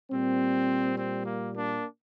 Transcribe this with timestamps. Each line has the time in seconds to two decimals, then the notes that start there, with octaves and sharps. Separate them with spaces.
0.10 A#2 G3 C4
0.96 C4
1.25 A#3
1.54 A#3 D4